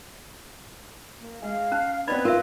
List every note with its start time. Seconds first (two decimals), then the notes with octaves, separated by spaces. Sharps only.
1.20 A#3
1.42 G#3 F5
1.72 C#4 A5
2.07 B3 C4 D4 B4 D5 D#5 B5
2.25 F4 A#4 E5